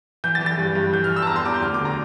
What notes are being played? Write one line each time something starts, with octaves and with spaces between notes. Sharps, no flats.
E3 G6
A6
E3
A6
G2
G2
E3 G6
F6
E3
E6
A5
E2 A#5
C6
E2 D6
G6
D2 F6
D6
D3
A#5